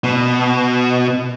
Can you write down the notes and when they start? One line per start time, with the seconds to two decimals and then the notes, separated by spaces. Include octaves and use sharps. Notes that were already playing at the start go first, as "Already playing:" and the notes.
0.04 B2